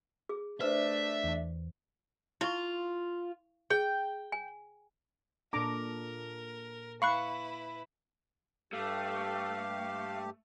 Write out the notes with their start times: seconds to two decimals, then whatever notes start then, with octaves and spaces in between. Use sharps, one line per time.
0.29 G#4
0.61 A3 D4 B4 C5 E5
1.24 E2
2.41 E4 F4 C#6
3.70 G#4 G5
4.32 G#5
5.53 A#2 D4 A4 A#4 A#5 D6
7.02 E4 B4 F5 B5 C#6 F#6
8.73 G2 A3 G4 F5